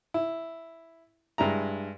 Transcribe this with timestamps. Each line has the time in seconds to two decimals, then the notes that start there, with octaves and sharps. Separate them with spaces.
0.14 E4
1.38 G2 G#3 E4 A#5